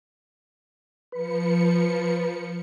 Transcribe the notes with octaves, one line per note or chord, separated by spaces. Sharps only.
F3 B4 C#7